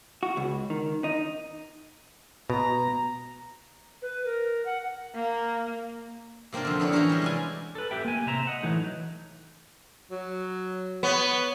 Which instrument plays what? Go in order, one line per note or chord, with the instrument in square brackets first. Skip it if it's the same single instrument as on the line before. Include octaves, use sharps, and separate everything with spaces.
[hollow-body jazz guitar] F#4
C#2
D#3
D#4
[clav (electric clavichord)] B2 [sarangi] A#5
[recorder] B4
A#4
F#5
[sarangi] A#3
[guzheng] C3 A#3 C4 D4 F4
F2 D3
B3 D4 E4 C#5
E3 C#4 F#4 G4 A#4
G3 G#3
C3 D5 G#5
[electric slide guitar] A4 B4
G4 A4 E5 G5
A#3 G#5
C3 C4 E5 A#5
D#5 F#5
E3 F#3 A3 D#4
[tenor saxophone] F#3
[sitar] B3 [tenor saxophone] C#5